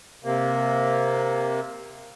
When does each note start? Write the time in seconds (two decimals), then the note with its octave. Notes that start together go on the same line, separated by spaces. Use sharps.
0.24 C3 A#3